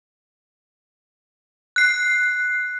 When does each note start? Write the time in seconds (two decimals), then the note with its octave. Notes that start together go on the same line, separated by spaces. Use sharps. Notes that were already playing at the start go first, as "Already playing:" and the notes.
1.76 F#6 C7